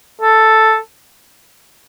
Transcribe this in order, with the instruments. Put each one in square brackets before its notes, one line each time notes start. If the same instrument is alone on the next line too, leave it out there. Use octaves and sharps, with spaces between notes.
[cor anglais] A4